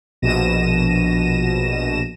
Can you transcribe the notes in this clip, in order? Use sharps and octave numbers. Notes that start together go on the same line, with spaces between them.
A#1 B2 A#6 D#7 E7